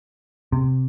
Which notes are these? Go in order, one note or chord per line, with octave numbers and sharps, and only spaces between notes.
C3